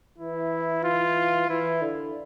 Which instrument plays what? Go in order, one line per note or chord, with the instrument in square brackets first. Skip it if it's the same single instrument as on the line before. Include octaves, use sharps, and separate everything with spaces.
[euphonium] E3 [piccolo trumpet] E4
[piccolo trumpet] F4
[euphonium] E3 [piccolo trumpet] E4
[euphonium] D3